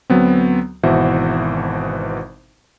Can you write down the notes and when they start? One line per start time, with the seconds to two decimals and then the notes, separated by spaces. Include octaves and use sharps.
0.10 D2 F#3 B3 C4
0.83 G#1 B2 E3 C5 E5 F#5